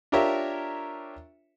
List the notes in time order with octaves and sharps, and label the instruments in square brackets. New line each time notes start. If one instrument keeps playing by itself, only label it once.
[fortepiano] D4 F4 G4 A#4 C#5 E5